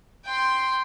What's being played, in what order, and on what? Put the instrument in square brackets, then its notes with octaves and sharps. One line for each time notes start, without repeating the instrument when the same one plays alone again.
[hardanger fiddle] G5 C6